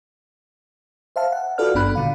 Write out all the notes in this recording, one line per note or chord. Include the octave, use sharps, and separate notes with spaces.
C5 E5 F5 A5
F#5
F4 F#4 A4 B4 D5 F6
G#1 G2 B3 D4 B5 F#6
A#2 D3 F5